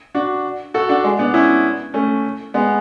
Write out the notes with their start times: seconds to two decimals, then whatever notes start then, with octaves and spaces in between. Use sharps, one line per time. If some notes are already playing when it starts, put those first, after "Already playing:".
0.15 D4 F#4
0.74 F#4 A4
0.89 D4 F#4
1.04 G#3
1.19 B3 D4
1.34 C#4 E4
1.94 A3 C#4
2.54 G#3 B3